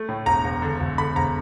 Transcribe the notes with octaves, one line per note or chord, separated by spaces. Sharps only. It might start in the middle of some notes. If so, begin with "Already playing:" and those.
Already playing: A3
A2
E1 A#5
E1
D3
E1
D3 B5
E1 A#5